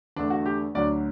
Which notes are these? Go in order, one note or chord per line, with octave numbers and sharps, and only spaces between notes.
E2 D3 A3 D4
F#4
G4
D2 D3 F#3 D5